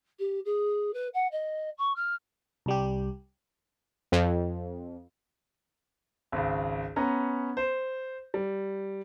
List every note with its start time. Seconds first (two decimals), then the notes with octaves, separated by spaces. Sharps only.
0.19 G4
0.45 G#4
0.93 B4
1.14 F#5
1.31 D#5
1.78 C#6
1.96 F6
2.66 C2 G3 G4
4.12 F2
6.32 G#1 C#2
6.96 B3 C#4 A#5
7.57 C5
8.34 G3